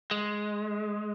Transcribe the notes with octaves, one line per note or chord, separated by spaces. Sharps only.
G#3